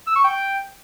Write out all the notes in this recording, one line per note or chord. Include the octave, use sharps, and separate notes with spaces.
E6
C#6
G5